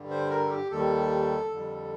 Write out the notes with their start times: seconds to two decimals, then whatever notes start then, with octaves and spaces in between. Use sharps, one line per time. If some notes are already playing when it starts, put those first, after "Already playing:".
Already playing: G2 D3 G3
0.10 C5
0.30 A#4
0.45 A4
0.50 G4
0.71 D#2 D#3 G3 A4
1.51 F2 D3 G3